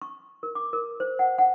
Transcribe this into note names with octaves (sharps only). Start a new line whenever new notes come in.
C#6
A#4
D6
A#4
C5
F#5
F#5